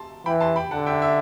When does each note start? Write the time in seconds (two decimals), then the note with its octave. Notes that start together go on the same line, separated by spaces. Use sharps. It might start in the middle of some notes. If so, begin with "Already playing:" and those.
Already playing: A5 C6
0.26 E3 G5 B5
0.40 A5 C6
0.56 G5 B5
0.71 D3 F#5 A5
0.86 E5 G5
1.02 E5